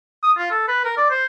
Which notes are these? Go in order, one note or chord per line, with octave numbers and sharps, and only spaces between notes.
D#6
F4
A4
B4
A#4
D5
C5